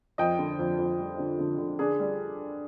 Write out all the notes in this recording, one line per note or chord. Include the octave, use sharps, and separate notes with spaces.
F2 D#5 G5
D3
F2
F2
G3
D3
D3
D3
D4 G#4
G3